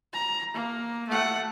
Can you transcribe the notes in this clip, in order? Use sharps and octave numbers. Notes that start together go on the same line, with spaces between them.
A#5
A#3
A3 F#5